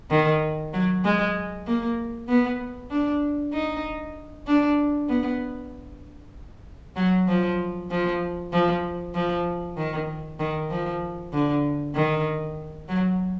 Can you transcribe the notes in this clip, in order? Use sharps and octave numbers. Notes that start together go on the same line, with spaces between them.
D#3
F#3
G#3
A#3
B3
D4
D#4
D4
B3
F#3
F3
F3
F3
F3
D#3
D#3
F3
D3
D#3
F#3